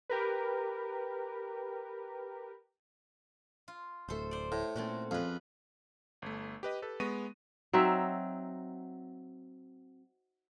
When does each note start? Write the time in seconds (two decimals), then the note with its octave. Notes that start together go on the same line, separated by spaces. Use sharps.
0.09 G4 A#4 B4
3.68 F4
4.08 D1 A3 A4 C5
4.31 C5 D5
4.52 A2
4.76 A#2 A3 C4 C#4 F#4
5.11 F2 G#4 B4
6.22 G1 A3
6.63 G4 B4 D#5
6.82 G4 A4 B4
7.00 G#3 B3 C#6 A#6 D#7
7.73 F#3 C4 D#4 E5